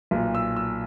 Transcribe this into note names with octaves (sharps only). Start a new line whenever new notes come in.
B1 A#2
E6
E6